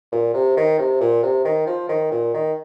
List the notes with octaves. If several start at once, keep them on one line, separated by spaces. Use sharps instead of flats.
A#2
C3
D#3
C3
A#2
C3
D#3
F3
D#3
A#2
D#3